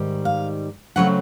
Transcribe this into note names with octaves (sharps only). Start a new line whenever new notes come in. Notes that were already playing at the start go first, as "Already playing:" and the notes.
Already playing: G#2 D#3 G3
F5
C#3 F#3 A3 C4 F#5